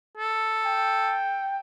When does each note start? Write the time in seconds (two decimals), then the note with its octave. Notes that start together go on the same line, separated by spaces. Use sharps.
0.18 A4
0.66 G5